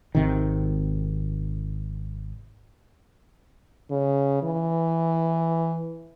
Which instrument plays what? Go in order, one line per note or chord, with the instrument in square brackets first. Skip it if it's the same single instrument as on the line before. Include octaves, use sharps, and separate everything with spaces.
[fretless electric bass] G#1 C3 D#3
[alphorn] C#3
E3